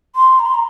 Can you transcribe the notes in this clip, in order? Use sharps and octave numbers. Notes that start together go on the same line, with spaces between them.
C6
A#5
C6
A#5